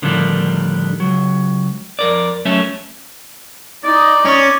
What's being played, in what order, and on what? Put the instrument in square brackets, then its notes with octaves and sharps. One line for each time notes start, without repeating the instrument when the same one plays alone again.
[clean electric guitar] A2 D3 D#3 F3 G3
C#2 F#3
F2 A#4 D5
F#3 A3 C#4 A4 E5
[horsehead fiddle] D#4 D#5 [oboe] D5
[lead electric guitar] C#4 [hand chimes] C#6 D6